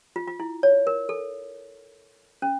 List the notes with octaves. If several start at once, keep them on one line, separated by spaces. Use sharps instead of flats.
F4
F4
E4
C#5
A#4
A4
C#4